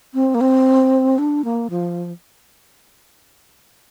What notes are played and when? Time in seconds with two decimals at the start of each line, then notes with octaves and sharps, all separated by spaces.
0.14 C4
0.34 A#3
0.41 C4
1.18 D4
1.44 A#3
1.70 F3